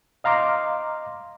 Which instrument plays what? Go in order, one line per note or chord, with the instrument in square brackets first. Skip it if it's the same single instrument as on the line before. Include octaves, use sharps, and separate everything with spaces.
[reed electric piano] D#5 F5 A#5 C6 D6